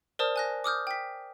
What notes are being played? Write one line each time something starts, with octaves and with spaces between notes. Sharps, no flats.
A#4 C5 D5 A5 D#6 F6
G#5 F#6 A#6
D6 D#6 F6 G6
G5 B6